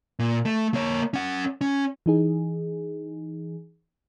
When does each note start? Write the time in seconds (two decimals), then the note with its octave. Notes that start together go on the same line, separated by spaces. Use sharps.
0.19 A#2
0.46 A3
0.74 A#3 C#5
1.14 C#4 F#5
1.61 C#4
2.06 E3 D#4 G#4